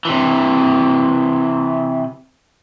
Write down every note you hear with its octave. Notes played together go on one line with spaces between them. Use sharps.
C3 E3